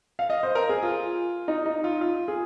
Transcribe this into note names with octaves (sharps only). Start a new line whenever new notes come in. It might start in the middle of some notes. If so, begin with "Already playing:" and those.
F5
D#5
C5
A#4
G#4
F4
D#4
D#4
F4
F4
G#4